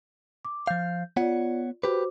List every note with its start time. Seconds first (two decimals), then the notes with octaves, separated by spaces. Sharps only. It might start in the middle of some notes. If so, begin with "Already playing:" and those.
0.45 D6
0.67 F3 F5 G6
1.17 B3 F4 C#5 D5 F#5
1.84 F#4 G4 B4 C5 D6